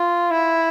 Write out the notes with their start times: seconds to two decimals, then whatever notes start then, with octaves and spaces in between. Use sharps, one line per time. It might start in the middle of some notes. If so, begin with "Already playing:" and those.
Already playing: F4
0.31 E4